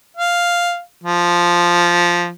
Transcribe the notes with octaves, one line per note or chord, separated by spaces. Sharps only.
F5
F3